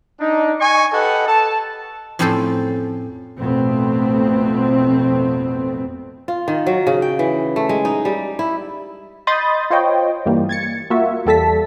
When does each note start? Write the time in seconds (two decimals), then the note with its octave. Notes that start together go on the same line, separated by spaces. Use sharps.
0.20 D4 D#4
0.60 D#5 G#5 C#6
0.93 G4 A4 B4 D#5 F#5
1.27 A4 A5
2.19 F2 A2 C4 C#4 A4 C5
3.37 A1 F2 B2 A3 B3 C4
6.28 F4
6.48 D#3
6.67 F#3
6.87 C#3
7.02 G5
7.19 E3
7.56 A3
7.69 G#3
7.85 D#4
8.05 G3
8.39 E4
9.27 D#5 B5 C6 D#6 G6 A6
9.70 F4 C5 C#5 D#5 G5
10.26 G2 E3 G3 A#3
10.49 G#6 A6 C#7
10.90 A#3 F4 F#4 E5
11.26 E2 G3 A4 A5 B6